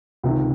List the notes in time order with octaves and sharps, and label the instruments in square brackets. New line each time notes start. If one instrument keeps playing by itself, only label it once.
[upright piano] C#2 C3 D#3